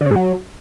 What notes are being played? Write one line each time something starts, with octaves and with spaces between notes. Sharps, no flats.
D3
C#3
G#2
F#3